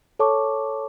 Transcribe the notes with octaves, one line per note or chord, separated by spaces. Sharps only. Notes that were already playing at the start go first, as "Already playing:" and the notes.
A4 C#5 A5 C#6 D6